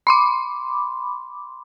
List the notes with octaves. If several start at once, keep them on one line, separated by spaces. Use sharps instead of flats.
B5 C6 D6